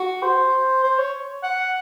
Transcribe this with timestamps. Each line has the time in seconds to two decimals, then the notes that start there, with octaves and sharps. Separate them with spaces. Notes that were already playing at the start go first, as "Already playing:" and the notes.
Already playing: F#4
0.23 C5
0.84 C5
0.98 C#5
1.43 F#5